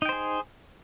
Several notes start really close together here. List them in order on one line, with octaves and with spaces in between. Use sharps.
D#4 G5 C5 G#4